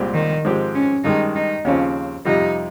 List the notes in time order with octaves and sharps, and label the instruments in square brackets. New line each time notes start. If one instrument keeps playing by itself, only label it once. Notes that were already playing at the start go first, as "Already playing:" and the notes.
Already playing: [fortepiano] C2 A#2 G#3 C4 G4
[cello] D#3
[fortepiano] G#2 F3 G#3 C4 G4
[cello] C#4
[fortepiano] G2 D#3 G#3 [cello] D#4
[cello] D#4
[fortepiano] D#2 C#3 F3 C4 [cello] C#4
[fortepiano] F2 C3 G3 [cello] D#4